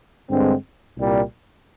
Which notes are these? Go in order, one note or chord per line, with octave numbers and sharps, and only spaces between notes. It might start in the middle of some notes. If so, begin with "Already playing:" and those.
G2 D3 G#3 C4
C2 A#2 G3